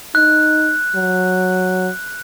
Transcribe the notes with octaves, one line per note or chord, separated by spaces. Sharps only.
D#4 F#6
F#3